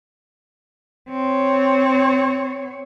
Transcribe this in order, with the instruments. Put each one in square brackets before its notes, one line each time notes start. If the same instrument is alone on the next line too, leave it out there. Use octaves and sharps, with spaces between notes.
[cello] C4 C#5